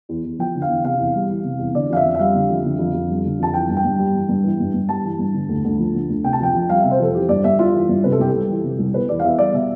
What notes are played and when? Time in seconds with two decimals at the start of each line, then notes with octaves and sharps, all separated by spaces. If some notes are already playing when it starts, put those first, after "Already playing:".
0.09 E2
0.24 E2
0.39 F3 G5
0.55 D3
0.62 F5
0.69 E2
0.84 C3 F5
0.99 E2
1.15 G3
1.29 E3
1.44 C3
1.59 E2
1.74 D3 D5
1.90 F2 F5
1.96 E5
2.05 F2
2.15 E5
2.19 G3 F5
2.35 D3
2.49 F2
2.65 D3
2.79 F2
2.94 F2
3.10 G3
3.25 D3
3.40 F2 A5
3.54 E3 G5
3.69 G2
3.77 G5
3.84 G2
3.99 G3
4.15 E3
4.29 G2
4.44 E3
4.60 G2
4.74 G2
4.89 G3 A5
5.04 E3
5.19 G2
5.34 D3
5.49 D2
5.64 D2
5.79 F3
5.94 D3
6.09 D2
6.24 C3 G5
6.33 A5
6.40 F2 G5
6.54 F2
6.69 G3 F5
6.80 C3 E5
6.91 C5
7.00 F2 A4
7.14 E3 G4
7.29 G2 D5
7.44 G2 E5
7.59 G3 F4
7.74 E3
7.89 G2
8.04 C3 B4
8.12 A4
8.19 C2 G4
8.29 G3 A4
8.50 E3
8.64 C3
8.79 C2
8.94 B2 B4
9.09 E2 D5
9.20 F5
9.24 E2 E5
9.39 G3 D5
9.54 B2 E5